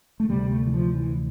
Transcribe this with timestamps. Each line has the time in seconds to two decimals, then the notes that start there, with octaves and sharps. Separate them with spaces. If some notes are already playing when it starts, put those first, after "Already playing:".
0.20 A3
0.29 D2 C3 G3
0.51 A3
0.67 E3
0.74 F3
0.95 E3